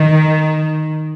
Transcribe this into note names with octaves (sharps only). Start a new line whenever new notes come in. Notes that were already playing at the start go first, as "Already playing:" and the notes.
Already playing: D#3